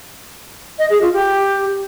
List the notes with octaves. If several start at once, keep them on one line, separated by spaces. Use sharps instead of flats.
D#5
G#4
F4
G4